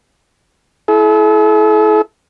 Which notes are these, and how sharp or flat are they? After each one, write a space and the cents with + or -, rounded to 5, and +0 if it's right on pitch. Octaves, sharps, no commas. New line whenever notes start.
E4 +0 A4 -45